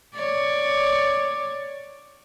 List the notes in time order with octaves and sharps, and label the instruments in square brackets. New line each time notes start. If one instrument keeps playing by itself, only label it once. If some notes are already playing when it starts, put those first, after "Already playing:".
[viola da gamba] C#5 D5